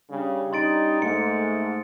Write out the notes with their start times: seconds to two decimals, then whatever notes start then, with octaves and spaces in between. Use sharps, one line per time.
0.11 C#3 G3 C#4 D4
0.53 D#4 C6 A6 D7
1.02 G#2 A3 A#3 C#7